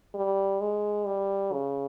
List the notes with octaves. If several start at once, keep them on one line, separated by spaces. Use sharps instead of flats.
G3
G#3
G3
C#3